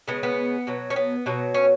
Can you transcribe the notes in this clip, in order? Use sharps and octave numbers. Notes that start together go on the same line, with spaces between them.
C#3 G#3 B3
B3
B2 F#3
C#4
B3
B2 F#3
C#4